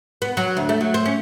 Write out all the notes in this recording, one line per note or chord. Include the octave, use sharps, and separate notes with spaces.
B3
F#3
D2
A3
F#3
C4
C#4